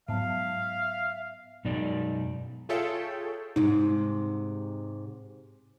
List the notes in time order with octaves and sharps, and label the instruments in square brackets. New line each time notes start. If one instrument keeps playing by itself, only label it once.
[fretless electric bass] G#2 F#3 [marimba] B3 A5 [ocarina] E5 [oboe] F5
[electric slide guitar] F#2 D#4 D5 [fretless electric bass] B2 G#3
[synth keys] F4 G#4 A4 C#5 E5 G5
[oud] G#2 C3 [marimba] D#4